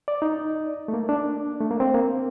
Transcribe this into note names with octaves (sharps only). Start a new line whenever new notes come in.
D5
D#4
A3
A#3
D4
A3
A#3
C4
A#3